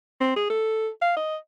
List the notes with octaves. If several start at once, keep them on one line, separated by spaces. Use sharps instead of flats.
C4
G#4
A4
F5
D#5